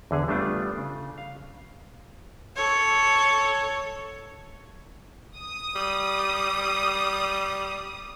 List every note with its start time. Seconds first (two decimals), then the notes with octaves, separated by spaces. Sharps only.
0.11 E2 D3 G#4
0.28 G3 A3 B3 D4 F4
0.78 C#3
1.18 F5
2.56 A4 C#5
5.38 D#6
5.75 G3